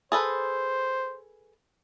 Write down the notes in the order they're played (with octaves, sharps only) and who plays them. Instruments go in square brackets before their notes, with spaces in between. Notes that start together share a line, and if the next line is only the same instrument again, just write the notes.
[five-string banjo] G#4 A4 B4 [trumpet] C5